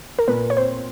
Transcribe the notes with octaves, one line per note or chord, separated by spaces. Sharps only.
A#4
A#2 B4
C#5
C4 C5